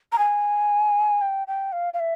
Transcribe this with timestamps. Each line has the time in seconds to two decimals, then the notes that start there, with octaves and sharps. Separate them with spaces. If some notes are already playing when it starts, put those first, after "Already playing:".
0.12 A#5
0.18 G#5
1.21 G5
1.48 G5
1.72 F5
1.94 F5
1.99 E5